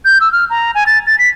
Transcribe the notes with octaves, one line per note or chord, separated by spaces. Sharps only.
G6
E6
F6
A#5
G#5
A6
A6
B6